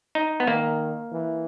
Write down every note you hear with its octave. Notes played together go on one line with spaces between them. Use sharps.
D#4
B3
D#3 A#3
E3